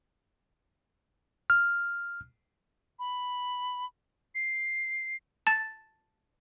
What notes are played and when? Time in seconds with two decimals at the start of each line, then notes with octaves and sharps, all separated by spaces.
1.50 F6
2.99 B5
4.35 C7
5.47 A5 A6